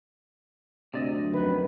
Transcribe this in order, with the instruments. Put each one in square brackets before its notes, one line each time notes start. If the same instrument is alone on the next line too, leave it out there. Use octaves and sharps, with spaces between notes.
[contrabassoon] D2 [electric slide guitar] C3 D5 D#5
[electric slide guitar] F#2
[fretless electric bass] F2 D#3 [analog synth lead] B4